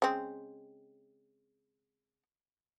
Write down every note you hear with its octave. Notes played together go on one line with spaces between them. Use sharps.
C#3 G#3 C4